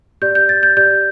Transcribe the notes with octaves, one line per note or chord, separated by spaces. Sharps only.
G4 D5 G6
G6
A6
G6
G4 D5 G6